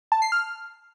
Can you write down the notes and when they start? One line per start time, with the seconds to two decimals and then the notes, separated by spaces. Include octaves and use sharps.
0.12 A5
0.22 C7
0.32 F6